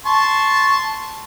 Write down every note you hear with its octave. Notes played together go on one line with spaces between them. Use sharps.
A5 C6 C#6